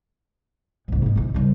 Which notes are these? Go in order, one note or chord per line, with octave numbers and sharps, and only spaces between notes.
C2 G#2
G#2 B3
A#1 D#3
C#3 G3